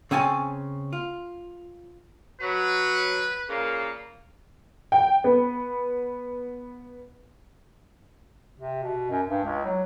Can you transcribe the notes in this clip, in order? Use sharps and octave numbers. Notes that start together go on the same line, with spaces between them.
C#3 C4 C#4 G#5 A5
F4
F#3 B4
A#2 C#3 A#3
G5
B3
C3
B2
F#2
G2
C#2
F#3